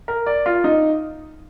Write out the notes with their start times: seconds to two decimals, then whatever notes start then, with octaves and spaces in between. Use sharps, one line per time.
0.08 A#4
0.26 D5
0.46 F4
0.64 D#4